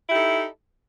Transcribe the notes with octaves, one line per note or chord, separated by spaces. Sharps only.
D#4 E4 G4 A4